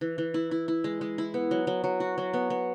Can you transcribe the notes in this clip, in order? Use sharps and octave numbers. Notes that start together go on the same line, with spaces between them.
E3
E3
E4
E4
E4
G#3
G#3
E4
B3
F#3
F#3
F#3
F#4
F#3
B3
B3